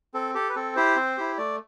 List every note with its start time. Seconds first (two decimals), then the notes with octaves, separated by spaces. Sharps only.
0.14 C4 A4
0.35 G4 A4
0.49 B4
0.56 C4 A4
0.76 E4 G4 C5
0.96 C4
1.17 E4 G4
1.37 A3 D5